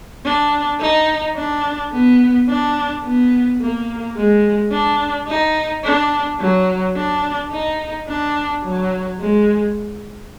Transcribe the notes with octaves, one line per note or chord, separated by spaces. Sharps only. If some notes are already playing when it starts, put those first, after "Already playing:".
D4
D#4
D4
B3
D4
B3
A#3
G#3
D4
D#4
D4
F#3
D4
D#4
D4
F#3
G#3